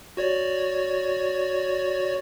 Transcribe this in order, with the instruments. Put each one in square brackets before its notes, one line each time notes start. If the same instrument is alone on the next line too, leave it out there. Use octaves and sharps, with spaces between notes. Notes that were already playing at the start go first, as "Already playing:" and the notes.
[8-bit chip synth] F#4 C#5 D5